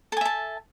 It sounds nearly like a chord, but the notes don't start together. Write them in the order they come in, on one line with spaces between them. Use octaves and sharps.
A4 G#5 E5 A5